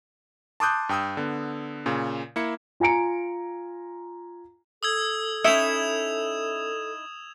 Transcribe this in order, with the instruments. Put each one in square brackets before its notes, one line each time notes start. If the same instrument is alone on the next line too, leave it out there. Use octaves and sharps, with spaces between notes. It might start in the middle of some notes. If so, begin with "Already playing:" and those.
[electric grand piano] A5 C6 D6 D#6 F#6 G6
G2 G5 D#6 E6 G6
D3 B3
A#2 C#3
A#3 E4 C#7
[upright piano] F4 G#5 A#5 C#7 D7
[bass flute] A4 [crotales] D#6 E6 G#6
[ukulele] C#4 E5 [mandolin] D#4 E4 E6 [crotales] D#6 E7 F7